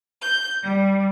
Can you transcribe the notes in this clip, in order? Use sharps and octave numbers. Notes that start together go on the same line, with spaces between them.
G6
G3